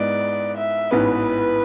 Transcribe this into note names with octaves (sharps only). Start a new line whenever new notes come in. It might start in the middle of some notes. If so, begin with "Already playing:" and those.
Already playing: G#2 G#3 B3 E4 D5
E5
A1 G#2 E3 B3 B4